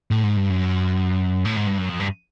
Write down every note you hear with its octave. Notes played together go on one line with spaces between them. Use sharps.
A2
G#2
G2
F#2
A2
G#2
G2
F#2
F2
G2